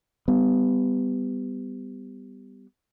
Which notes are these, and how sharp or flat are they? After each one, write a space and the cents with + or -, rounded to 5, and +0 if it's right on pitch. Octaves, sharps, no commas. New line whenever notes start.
G3 +0 B3 +20